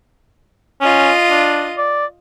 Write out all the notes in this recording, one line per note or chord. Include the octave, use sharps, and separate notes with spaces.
C#4 F4 D#5
D4
D5